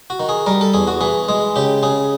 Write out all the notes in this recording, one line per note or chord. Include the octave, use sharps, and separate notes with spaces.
F#4
D#3
G#4
G3 A#4
A4
E2 G#4
F#4
E3 G#4
G#3 G#4
C#3 G4
C#3 G#4